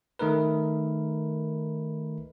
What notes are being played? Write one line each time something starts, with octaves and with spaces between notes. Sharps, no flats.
D#3 A3 D#4 A#4 B4